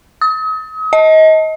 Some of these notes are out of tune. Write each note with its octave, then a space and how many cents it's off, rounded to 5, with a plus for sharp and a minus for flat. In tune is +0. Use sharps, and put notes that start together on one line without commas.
D#6 +40
D#5 +25